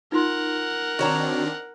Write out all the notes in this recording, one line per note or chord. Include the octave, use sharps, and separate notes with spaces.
D#4 F4 A#4 F#5 C6
D#3 C4 D4 F#4 C#5 A#5